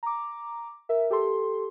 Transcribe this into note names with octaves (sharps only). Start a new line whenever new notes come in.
A#5 D6
A#4 E5
G4 A4 C6